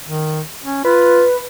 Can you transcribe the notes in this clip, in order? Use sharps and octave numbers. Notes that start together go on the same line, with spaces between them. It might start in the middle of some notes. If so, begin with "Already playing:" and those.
D#3
C#4
F4 B4